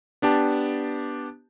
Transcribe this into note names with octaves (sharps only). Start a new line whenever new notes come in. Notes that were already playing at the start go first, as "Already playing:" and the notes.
B3 D4 G4 A5